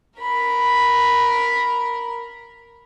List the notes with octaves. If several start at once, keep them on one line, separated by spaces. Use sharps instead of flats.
A#4 B5